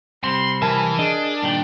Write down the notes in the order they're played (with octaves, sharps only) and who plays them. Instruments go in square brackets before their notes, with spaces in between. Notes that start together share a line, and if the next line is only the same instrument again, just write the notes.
[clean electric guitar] C3 G3 C4 [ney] B5 [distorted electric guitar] C6
[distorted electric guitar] E3 E5 [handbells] A#4 G#5 A5
[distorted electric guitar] D4 [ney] G#4 [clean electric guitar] D#5
[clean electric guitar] G2 A#2 D#3 [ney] G5